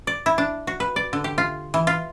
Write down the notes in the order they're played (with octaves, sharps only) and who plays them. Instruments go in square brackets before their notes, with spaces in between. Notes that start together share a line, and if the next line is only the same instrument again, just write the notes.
[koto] D5
E4
D4
F#4
B4
D5
D3
G4
F4
E3
F4